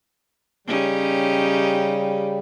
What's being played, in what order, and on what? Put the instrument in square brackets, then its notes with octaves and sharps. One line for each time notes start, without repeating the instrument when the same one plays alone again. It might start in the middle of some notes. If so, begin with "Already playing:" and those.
[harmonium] C#3 G3 [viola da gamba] C#4 D#4 G4